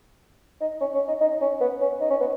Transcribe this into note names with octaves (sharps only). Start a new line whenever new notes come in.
D#4
C#4
C#4
D#4
D#4
C#4
B3
C#4
D#4
C#4
B3